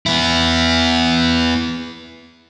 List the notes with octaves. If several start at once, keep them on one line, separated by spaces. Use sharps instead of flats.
B3 E4